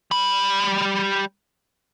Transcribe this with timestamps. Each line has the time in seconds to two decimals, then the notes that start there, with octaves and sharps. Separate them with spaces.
0.11 G3 B5